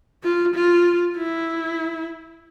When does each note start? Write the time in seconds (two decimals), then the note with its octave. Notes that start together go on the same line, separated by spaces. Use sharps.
0.23 F4
0.54 F4
1.17 E4